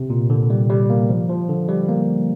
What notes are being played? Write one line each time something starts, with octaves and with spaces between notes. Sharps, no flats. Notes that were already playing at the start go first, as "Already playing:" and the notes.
Already playing: C3
A#2
D3
G3
G3
A#3
F3
F3
D3
G3
A#3